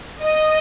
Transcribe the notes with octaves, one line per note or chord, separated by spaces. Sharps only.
D#5